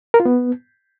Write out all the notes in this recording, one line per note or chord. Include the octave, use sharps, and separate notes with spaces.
A#4
F4
B3